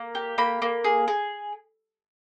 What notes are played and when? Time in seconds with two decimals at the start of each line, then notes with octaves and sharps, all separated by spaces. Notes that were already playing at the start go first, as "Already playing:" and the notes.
Already playing: A#3
0.15 G4
0.38 A#3 B5
0.62 A#3
0.84 G#4
1.08 G#4